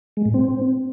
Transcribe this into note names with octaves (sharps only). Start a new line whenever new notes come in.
G#3
A2
C4